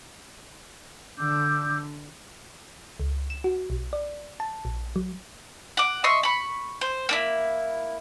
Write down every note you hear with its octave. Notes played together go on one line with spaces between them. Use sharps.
D3 D6 E6 G6
C#2
E7
F#4
B1
D5
A5
A#1
F#3
F#5 D6
D#5 E5 C6 C#6
B5 C#6
C5
A#3 D4 E4